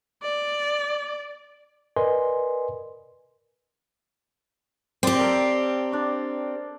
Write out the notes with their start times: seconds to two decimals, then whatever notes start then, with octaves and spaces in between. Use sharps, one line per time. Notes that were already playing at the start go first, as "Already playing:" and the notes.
0.23 D5
1.97 A#4 B4 D5 D#5 G#5 C6
5.03 C4 G4 C5 D5 C6
5.18 A4 A#4
5.92 D4 D5